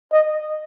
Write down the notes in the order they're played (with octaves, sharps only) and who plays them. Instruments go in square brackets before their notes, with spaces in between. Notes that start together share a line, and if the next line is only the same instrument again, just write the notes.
[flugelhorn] D#5